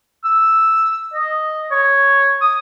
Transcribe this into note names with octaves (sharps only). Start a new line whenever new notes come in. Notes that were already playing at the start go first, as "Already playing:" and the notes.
E6
D#5
C#5
D#6